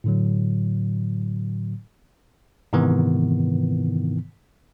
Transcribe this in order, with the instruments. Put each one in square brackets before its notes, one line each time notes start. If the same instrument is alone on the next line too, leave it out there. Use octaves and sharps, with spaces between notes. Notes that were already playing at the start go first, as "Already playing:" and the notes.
[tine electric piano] A2 D3 F#3
G#2 C3 D#3 E3 B3